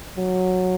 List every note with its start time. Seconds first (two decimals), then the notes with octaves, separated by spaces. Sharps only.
0.17 F#3